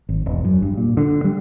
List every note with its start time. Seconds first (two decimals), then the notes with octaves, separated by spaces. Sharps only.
0.09 G#1
0.26 E1
0.45 F#2
0.62 G2
0.77 A#2
0.97 D3
1.24 G3